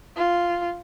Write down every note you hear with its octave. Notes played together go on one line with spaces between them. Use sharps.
F4